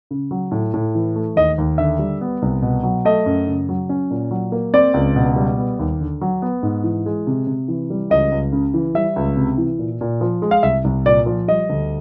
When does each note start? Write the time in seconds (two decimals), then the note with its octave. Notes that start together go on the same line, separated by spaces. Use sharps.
0.11 C#3
0.31 F#3
0.51 A2
0.74 A2
0.95 E3
1.16 A3
1.36 D#2 D#5
1.58 D#2
1.78 D3 E5
1.99 G3
2.21 B3
2.42 C2
2.62 B2
2.83 F#3
3.05 A3 D#5
3.26 F#2
3.47 C#3
3.69 F#3
3.89 C#4
4.11 A#2
4.31 F#3
4.52 A#3
4.74 C4 D5
4.94 C#2
5.15 B2
5.36 G3
5.58 B3
5.79 D#2
6.01 D3
6.21 F#3
6.42 B3
6.63 G#2
6.84 E3
7.06 G#3
7.27 C3
7.47 C3
7.68 E3
7.90 G3
8.10 C#2 D#5
8.32 C#2
8.52 C#3
8.74 E3
8.94 G3 E5
9.16 C#2
9.37 C3
9.58 E3
9.79 A#2
10.01 A#2
10.21 F3
10.42 G#3
10.51 F5
10.63 C2 E5
10.84 C2
11.05 A#2 D5
11.26 F3
11.48 G3 D#5
11.69 D2